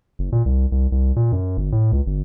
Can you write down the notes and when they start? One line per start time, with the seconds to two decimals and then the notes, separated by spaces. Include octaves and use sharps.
0.19 F#1
0.32 A#2
0.46 C2
0.72 C2
0.92 C2
1.16 A#2
1.32 F#2
1.58 G1
1.72 A2
1.92 C#2
2.07 G1